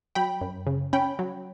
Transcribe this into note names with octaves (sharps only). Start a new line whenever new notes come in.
F#3 G5 B5
F#2
C#3
C#4 G5 B5
F#3